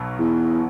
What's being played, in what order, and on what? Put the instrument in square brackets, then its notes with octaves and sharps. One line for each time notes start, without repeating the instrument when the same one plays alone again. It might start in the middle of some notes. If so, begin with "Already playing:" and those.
Already playing: [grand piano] B1 B2 F#3 B3
[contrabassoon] E2